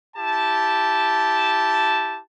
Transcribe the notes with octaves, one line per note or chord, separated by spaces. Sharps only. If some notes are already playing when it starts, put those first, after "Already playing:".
E4 G4 A5